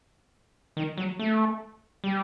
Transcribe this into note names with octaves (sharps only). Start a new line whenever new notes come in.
D#3
F#3
A3
G3